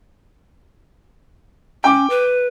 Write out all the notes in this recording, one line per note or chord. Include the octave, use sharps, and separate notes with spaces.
C#4 G5 D6
B4